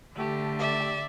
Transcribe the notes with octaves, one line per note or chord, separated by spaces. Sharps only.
D3 A3 G4
D5 E5